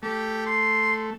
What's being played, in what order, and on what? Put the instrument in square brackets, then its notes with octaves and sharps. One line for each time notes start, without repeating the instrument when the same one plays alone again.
[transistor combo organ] A3 [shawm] G4
[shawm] C6